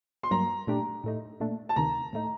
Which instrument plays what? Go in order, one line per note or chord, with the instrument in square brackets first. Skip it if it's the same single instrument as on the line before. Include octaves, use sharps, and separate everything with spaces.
[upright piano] C6
[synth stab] G2 F#3 A#3 [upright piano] A#5
[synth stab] A#2 A3 D4 G4
A2 A3 D#4
A#2 A3 D4
[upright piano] A5
[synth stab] D2 C3 D#3 [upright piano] A#5
[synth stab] A2 A3 D#4